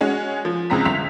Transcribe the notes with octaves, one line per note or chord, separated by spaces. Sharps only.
G#3 C#4 F#4
F3
C#2 C#3 C4 A#5 B6
G1 B6 F7